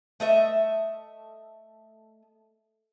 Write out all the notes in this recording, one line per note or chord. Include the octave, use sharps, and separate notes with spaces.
A3 D#5 E5